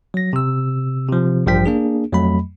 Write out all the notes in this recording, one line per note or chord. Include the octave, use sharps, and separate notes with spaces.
F#3 A#6
C3 E6
C3 F3
A1 G2 F3 G3 G5 B6
A#3 D4 G#4
F2 F#3 A3 B5